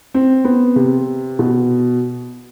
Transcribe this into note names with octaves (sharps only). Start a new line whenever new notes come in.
C4
B3
C3
B2